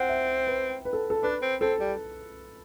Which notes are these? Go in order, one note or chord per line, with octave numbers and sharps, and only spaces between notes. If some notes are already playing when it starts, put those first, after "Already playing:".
Already playing: C4 F#5 G5
E5
B4
B4
A4
A4
D4 B4
C4
C4 A4
G3